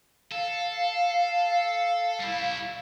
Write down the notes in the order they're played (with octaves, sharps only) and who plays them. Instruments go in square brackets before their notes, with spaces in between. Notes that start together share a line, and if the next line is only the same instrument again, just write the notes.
[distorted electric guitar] A4 [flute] F5
[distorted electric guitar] G3 E4